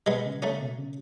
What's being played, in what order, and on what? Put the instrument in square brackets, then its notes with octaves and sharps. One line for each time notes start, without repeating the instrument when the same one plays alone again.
[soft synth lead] B2 [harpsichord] G#3 B3
[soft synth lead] C#3
[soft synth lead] C#3 [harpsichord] A3 C#4
[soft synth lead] B2
C#3